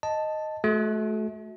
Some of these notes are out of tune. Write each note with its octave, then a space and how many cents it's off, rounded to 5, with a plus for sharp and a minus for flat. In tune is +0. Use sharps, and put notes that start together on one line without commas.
D#5 +0 A5 +0
A3 -30 F#4 -10